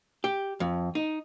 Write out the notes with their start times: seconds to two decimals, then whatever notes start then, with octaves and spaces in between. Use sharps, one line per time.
0.24 G4
0.60 F2
0.95 D#4